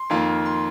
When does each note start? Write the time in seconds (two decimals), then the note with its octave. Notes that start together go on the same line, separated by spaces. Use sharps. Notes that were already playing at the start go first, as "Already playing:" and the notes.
Already playing: C6
0.10 F2 D#3 A#3 F4
0.46 C6